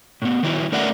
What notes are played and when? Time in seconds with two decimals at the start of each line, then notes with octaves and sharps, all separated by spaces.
0.22 A2 B3
0.43 D#3 F#3 E4
0.72 A3 C#4 A#4 D5 E5 F#5